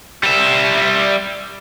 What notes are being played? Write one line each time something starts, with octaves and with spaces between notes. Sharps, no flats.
G3 E5